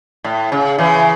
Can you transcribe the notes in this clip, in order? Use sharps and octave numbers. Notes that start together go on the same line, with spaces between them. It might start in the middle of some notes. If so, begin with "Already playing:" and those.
A2
C#3
C#3 E3